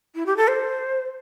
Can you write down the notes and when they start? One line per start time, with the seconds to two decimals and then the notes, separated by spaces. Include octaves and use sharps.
0.15 E4
0.26 G4
0.37 A4
0.48 C5